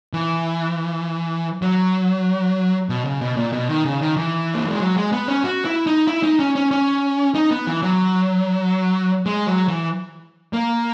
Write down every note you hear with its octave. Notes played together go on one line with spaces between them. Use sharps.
E3
F#3
B2
C#3
B2
A#2
B2
D#3
C#3
D#3
E3
A#3
G#3
F#3
G#3
B3
C#4
F#4
E4
D#4
E4
D#4
C#4
C#4
C#4
D#4
B3
E3
F#3
G#3
F#3
E3
A#3